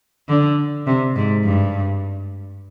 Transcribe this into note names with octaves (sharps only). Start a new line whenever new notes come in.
D3
C3
G#2
G2